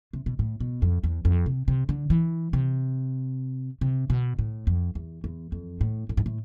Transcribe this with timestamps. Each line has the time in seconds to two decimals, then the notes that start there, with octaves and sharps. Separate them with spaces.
0.13 C3
0.26 B2
0.39 A2
0.60 B2
0.82 F2
1.04 E2
1.25 F2
1.46 C3
1.68 C3
1.89 D3
2.10 E3
2.53 C3
3.81 C3
4.10 B2
4.39 A2
4.67 F2
4.95 E2
5.24 E2
5.52 F2
5.81 A2
6.09 A2
6.17 G#2
6.26 A2